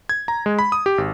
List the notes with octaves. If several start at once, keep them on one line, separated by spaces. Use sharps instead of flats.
G#6
A#5
G#3
B5
D#6
G4
G#1